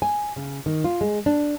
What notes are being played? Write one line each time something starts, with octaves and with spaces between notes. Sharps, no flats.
G#5
C#3
D#3
F4
G#3
D4